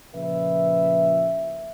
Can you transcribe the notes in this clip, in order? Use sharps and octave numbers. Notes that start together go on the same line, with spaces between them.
A#2 C#3 F3 B4 E5